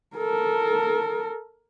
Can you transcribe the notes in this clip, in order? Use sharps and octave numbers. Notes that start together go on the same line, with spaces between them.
A4 A#4